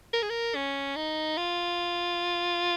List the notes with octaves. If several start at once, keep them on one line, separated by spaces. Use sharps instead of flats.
A#4
G#4
A#4
C#4
D#4
F4